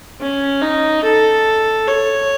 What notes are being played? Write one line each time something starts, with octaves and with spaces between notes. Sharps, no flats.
C#4
D#4
A4
C#5